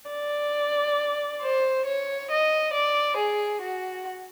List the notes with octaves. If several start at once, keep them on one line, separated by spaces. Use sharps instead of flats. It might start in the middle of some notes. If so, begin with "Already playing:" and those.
D5
C5
C#5
D#5
D5
G#4
F#4